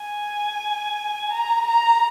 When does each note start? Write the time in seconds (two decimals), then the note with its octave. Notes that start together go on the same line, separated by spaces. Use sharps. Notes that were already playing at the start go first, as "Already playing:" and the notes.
Already playing: G#5
1.31 A#5
1.67 A#5